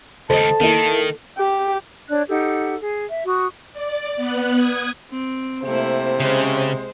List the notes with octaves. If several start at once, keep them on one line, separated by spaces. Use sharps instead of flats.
C#2 D#3 A4 C5 D#5 A5
D#3 A#3 E4
G4
D4 C#5 D5 F#6
D#4 G4 A4 F#5
G#4
E5
F#4 C#6 D#6
D5
B3 F#6
D#6 G#6
C4
C3 A3 A#3 E4 C5
C#3 G#3